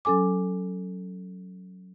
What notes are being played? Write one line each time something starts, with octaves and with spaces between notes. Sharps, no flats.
F#3 C#4 A4 G#5 D6